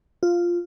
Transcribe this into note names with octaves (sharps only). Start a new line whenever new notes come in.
F4